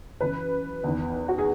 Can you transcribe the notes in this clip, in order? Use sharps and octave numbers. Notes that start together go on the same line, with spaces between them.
F#2 E3 B4
E2 D#3
F#4
G#4